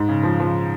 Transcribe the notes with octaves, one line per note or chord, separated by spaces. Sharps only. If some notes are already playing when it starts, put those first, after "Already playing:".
Already playing: G#2
C#3
F3
F3